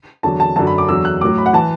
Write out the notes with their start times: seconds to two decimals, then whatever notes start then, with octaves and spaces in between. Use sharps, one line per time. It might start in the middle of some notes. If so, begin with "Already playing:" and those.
0.23 E2 D3 F#3 A5
0.40 A5
0.56 F#2 D3 F#3 A5
0.67 B5
0.78 D6
0.88 E2 D3 F#3 E6
1.05 F#6
1.21 A2 F#3 D6
1.38 B5
1.46 F#5
1.53 E3 A5